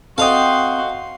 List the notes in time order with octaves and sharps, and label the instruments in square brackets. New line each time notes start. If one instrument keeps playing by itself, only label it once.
[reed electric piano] C4 D#6 [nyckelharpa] F#4 C6 [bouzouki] A4 D#5 G5 [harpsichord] F5